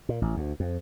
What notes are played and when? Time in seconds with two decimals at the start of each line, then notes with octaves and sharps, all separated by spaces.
0.09 A#2
0.22 A1
0.37 D2
0.60 F2